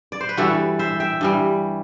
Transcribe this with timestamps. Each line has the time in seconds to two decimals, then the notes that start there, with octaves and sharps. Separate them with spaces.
0.12 D5
0.21 C5
0.29 B4
0.37 G2 E3 G3 F#4 A4
0.79 C5 E5
1.00 E5 G5
1.21 G2 E3 G3